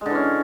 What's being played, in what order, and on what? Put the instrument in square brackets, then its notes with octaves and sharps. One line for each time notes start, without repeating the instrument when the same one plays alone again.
[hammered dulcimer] G#3
D3
E3
C#4